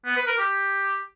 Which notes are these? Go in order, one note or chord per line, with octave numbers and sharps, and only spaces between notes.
B3
B4
A#4
G4